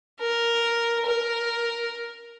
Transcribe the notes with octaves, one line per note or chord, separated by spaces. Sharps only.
A#4
A#4